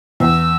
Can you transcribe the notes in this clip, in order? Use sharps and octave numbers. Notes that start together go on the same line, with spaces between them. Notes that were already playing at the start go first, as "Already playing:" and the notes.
E2 E6